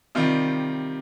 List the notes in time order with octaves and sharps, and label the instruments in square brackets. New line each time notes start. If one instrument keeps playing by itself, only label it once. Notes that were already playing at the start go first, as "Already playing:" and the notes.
[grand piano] C3 D#3 G3 F4